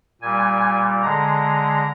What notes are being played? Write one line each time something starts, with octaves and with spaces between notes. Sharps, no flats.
A#2 G3 G#5
D3 G#3 A#5